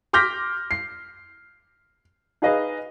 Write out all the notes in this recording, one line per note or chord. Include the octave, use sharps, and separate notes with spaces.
C6 D6 F6 G6 A#6 B6
C7
D#4 G#4 B4 D#5 F5